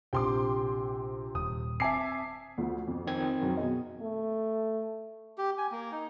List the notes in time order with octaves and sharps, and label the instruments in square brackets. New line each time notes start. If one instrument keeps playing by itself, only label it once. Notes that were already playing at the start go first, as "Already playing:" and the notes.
[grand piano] A#1 [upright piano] C3 [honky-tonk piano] G5 C6 D6
[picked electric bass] D#1 [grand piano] D#6
[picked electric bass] C4 [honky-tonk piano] E5 A5 C7 [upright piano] G#5 D6
[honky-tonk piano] D2 F3
F2
[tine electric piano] D#3 C4 G#6
[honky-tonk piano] F#2
B2 G#4 D#5
[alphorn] A3
[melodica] G4
G#5
A#3
D#4